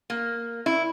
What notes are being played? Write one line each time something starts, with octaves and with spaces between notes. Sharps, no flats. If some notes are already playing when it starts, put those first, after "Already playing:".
A#3
E4